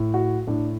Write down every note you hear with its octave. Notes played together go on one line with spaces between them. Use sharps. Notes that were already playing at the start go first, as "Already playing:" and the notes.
Already playing: A2
F#4
A2 D4